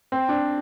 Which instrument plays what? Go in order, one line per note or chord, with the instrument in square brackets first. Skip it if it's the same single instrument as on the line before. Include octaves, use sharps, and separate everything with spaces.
[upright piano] C4
D4